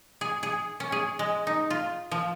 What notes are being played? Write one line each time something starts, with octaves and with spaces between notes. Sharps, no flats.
G#4
G#4
C#4
G#4
G#3
D#4
F4
F3